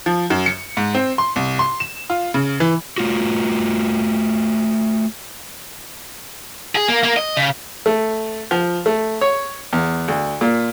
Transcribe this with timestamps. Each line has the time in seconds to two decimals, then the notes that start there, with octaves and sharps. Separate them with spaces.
0.06 F3
0.30 F#2
0.46 C#7
0.77 G#2
0.95 C4
1.18 C6
1.36 C2
1.59 C6
1.80 E7
2.10 F4
2.34 C#3
2.60 E3
2.98 A3 F4 F#4
6.75 G#4
6.88 A#3
7.03 A#3
7.17 D#5
7.37 C#3
7.86 A3
8.51 F3
8.86 A3
9.21 C#5
9.73 E2
10.08 D2
10.41 A#2